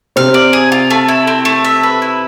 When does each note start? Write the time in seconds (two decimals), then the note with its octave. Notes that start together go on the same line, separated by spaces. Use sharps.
0.16 C3 C4 F5
0.34 D5
0.53 G#4
0.72 F4
0.91 A3
1.08 E4
1.27 C4
1.45 A3
1.65 E5
1.83 B4
2.02 E4